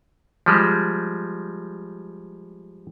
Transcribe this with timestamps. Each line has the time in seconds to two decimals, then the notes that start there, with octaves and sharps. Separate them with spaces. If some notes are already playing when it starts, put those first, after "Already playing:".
0.46 F3 G3 G#3